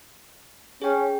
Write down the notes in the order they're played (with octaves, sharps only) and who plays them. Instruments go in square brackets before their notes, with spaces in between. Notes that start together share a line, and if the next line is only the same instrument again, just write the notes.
[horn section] C#4 [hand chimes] G#4 G5